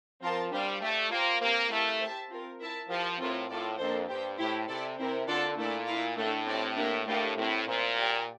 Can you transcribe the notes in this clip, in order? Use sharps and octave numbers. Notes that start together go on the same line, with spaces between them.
F3 C4 F4 A#4 F5 A5
G3 D4 G4 C5 F5
A3 G4 D5 A5
A#3 F4 C5 G5
A#3 C4 G4 A#4
A3 E4 G4 A#4 F5
G4 C5 E5 A5
C4 F4 A#4
E4 A#4 E5 A5
F3 G4 A#4 F5 A5
A2 C4 F4 A#4
A2 F4 A4 D5
F2 A#3 D4 A4 C5
G2 G4 C5 G5
A2 E4 G4 C5
C3 E4 A4 D5
C3 C4 E4 A#4
D3 D4 F4 A4 D5 A5
A#2 A3 E4 A4 D5
E4 A#4 F5
A2 A3 D4 A4
C4 G4 D5 A5
A#3 D4 G4 A#4 E5
A2 A3 D4 G4 A#4 F5
A2 A3 C4 E4
A#2 F4 C5 E5
G4 D5 G5